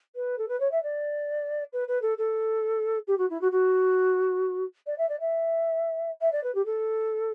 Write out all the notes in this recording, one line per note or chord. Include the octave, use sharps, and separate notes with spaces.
B4
A4
B4
C#5
E5
D5
B4
B4
A4
A4
G4
F#4
E4
F#4
F#4
D5
E5
D5
E5
E5
D5
B4
G4
A4